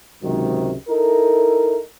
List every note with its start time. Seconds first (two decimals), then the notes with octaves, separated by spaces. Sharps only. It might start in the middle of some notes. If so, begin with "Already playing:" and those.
0.23 C#2 G#2 C3 D#3 F#3
0.88 D#4 E4 A4 A#4